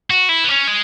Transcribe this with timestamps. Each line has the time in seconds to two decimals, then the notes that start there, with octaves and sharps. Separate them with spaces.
0.10 F#4
0.29 E4
0.44 B3
0.49 C#4
0.68 G#3